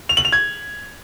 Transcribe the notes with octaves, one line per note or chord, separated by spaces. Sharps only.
F7
F#7
F7
G#6